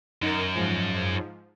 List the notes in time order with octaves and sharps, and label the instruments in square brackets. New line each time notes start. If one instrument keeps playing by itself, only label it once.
[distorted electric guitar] F#2 [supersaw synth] D#4 A#4
[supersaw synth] G#2 F3